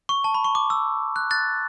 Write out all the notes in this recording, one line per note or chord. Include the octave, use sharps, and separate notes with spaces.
C#6
A5
B5
C#6
D6
E6
F#6
F#6 A6